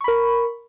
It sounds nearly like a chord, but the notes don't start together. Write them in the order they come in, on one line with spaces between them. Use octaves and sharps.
C#6 B5 A#4